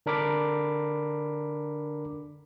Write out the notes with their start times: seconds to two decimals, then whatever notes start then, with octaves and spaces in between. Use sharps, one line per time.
0.06 D3 D4 A#4 B5 D6